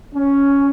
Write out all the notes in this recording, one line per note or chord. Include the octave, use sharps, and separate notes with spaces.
C#4